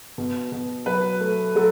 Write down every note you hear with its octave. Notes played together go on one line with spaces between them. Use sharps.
B2
B2
F#3 B4
A3
F#3 A4